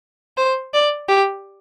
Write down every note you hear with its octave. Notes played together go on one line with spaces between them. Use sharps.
C5
D5
G4